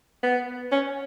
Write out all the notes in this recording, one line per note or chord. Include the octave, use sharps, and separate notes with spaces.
B3
C#4